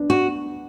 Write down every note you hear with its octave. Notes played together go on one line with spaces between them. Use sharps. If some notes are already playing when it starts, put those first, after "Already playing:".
Already playing: B3 D4
F#4